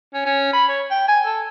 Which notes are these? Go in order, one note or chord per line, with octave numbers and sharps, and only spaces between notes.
C#4
C#4
B5
C#5
G5
G#5
A4